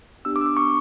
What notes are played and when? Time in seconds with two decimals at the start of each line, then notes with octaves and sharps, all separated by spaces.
0.25 B3 D4 G4 E6
0.36 D6
0.41 E6
0.46 D6
0.57 C#6